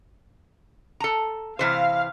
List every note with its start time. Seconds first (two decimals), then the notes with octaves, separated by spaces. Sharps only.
1.00 A4 A#5
1.59 C3 E3 C5 F5